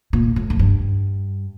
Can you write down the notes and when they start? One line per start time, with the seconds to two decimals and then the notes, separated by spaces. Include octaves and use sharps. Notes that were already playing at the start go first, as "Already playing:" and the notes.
0.13 A#2
0.36 A2
0.50 F2
0.59 G2